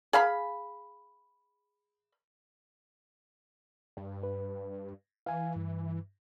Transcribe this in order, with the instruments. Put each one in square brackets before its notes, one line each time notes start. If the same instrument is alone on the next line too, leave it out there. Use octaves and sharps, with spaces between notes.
[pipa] G#4 F5 B5
[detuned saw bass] G2
[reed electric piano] B4
[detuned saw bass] E3 [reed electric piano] F5 G#5
[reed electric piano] G2